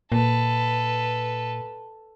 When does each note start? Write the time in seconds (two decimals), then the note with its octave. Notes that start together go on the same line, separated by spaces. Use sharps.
0.12 A#2 A4 B4